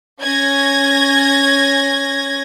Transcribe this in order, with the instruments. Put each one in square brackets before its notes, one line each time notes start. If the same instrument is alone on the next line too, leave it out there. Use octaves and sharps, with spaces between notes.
[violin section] C#4 G#6 A#6